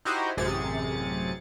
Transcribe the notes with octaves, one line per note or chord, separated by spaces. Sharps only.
D#4 E4 F#4 G4 C5 D#5
A1 F#2 C3 G#4 A6 C#7